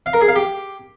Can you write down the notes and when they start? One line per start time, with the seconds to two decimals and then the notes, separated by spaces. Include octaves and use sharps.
0.06 F5
0.13 A#4
0.21 G#4
0.28 F5
0.36 G4